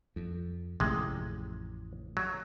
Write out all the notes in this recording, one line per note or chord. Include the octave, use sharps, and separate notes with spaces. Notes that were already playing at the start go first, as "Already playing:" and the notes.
F2
A1 F2 C3 G#3
F#3